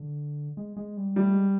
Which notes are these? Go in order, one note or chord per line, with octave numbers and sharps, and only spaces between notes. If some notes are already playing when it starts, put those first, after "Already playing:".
Already playing: D3
G#3
G#3
G3
G3 A3
G#3